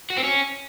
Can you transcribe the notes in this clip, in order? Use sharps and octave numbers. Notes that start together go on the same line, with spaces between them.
F#4
C4
C#4